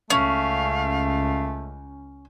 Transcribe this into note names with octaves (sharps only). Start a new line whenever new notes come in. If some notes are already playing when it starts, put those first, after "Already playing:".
C#2 A3 C#4 F5